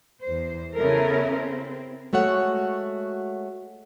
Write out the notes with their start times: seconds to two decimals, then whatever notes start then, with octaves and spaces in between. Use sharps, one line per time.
0.22 E2 C5
0.75 C#3 B3 E4 A4 A#4
1.31 C4
2.13 G#3 A3 F#4 C#5 F#5